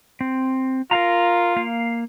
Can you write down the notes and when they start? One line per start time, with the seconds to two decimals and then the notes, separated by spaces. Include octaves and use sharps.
0.21 C4
0.91 F4 A#4 F5 A#5
1.56 A#3 F5